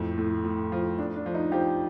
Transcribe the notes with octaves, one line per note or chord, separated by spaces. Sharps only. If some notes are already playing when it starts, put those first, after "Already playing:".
Already playing: F2 A2
A2
A2
F3
F3 D4
D4
F3
D#4
F3 G4